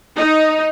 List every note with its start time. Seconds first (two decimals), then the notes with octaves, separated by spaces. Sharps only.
0.16 D#4